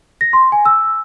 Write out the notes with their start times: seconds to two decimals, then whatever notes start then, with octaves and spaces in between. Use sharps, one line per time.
0.21 A#6
0.33 C6
0.52 G#5
0.65 E6